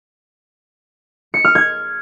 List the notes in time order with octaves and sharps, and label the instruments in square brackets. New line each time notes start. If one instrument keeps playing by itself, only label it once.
[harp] C#7
F6
G#6